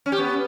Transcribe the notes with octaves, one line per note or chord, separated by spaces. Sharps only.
C#4
G4
B3